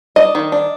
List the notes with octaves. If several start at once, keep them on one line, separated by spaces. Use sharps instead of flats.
D4 D#5
D#3
D4